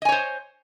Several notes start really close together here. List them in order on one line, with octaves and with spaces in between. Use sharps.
D#5 G#5 C#5 C5